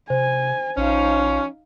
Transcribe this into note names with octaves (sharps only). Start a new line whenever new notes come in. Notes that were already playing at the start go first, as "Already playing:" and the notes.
C3 C5 G#5
A#1 F3 C#4 D#4 F5